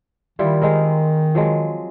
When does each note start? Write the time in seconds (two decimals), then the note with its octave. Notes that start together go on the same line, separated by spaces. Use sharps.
0.39 D#3 G3 E4 F4
0.61 G#3 C4 A#4
1.35 F3 F#3 G#3